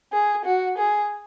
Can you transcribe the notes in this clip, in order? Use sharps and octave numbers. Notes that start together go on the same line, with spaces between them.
G#4
F#4
G#4